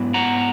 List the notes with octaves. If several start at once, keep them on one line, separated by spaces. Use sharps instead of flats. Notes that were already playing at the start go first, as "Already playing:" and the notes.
Already playing: G#2 F#3 B3 E4
F#5 A#5